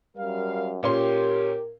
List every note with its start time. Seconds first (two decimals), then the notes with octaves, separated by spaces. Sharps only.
0.17 F#2 G3 A#4 F5
0.83 A#2 C#4 G4 A#4 C6